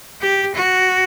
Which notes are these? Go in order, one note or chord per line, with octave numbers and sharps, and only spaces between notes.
G4
F#4